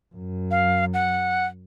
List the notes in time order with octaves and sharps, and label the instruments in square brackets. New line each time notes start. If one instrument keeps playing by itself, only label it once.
[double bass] F#2
[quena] F5
F#5